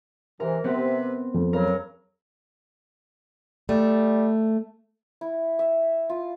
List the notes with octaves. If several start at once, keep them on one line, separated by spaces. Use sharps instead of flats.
G#2 C3 E3 A#4
C3 B3 C4 B4
F2
C#3 F#3 A#4
G3 A3
E4
E5
F4